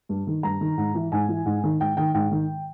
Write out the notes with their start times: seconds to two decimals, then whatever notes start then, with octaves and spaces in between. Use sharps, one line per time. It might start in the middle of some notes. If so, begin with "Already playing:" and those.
0.09 G2
0.27 D#3
0.43 G2 A#5
0.61 D#3
0.77 G#2
0.94 E3
1.12 G#2 G#5
1.28 E3
1.46 G#2
1.63 D#3
1.80 G#2 G5
1.97 D#3 G5
2.14 G#2 G5
2.31 D#3